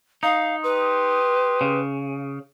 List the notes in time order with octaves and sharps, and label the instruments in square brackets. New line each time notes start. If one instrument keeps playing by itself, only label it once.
[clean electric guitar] D#4 [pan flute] F5
[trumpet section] G4 C6 D#6 [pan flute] B4
[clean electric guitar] C#3